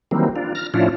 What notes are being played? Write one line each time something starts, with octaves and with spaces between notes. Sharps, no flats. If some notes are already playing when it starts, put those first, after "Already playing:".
D#3 E3 F#3 G3 A#3 C4
D4 F4
F6 A#6
A2 F3 C#4 D4 E4 F4